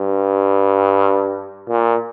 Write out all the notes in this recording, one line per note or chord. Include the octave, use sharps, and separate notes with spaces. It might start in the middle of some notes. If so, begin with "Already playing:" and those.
Already playing: G2
A#2